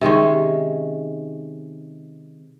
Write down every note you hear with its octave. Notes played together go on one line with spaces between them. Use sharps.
C3 D#3 G#3 C#4